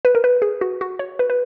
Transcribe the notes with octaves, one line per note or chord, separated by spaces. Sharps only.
B4
A#4
B4
G#4
F#4
F#4
C#5
B4
B4